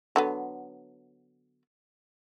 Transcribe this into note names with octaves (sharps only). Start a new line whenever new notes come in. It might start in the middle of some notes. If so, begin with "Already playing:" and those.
D3 F#3 B3